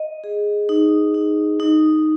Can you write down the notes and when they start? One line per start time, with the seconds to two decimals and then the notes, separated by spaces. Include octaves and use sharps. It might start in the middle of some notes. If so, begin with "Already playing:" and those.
Already playing: D#5
0.24 G#4
0.69 D#4
1.14 D#4
1.60 D#4